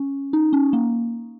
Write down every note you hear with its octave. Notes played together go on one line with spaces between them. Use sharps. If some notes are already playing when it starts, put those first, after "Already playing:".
Already playing: C#4
D#4
C#4
A#3